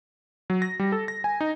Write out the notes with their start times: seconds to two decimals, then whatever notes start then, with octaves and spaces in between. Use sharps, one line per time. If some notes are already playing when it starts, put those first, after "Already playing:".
0.50 F#3
0.62 A#6
0.79 G3
0.92 A4
1.08 A#6
1.24 G#5
1.41 D#4